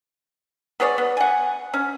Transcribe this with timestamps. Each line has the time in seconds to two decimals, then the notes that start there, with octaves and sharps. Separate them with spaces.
0.80 B3 G#4 C#5 D5
0.98 B3
1.17 F#5 G#5
1.74 C#4